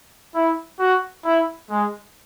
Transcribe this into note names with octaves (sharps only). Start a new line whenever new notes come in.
E4
F#4
E4
G#3